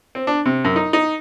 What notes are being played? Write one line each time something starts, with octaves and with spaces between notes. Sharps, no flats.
C4
D4
C3
F#2
D#4
D#4